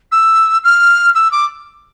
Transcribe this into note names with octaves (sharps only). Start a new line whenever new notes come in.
E6
F6
E6
D6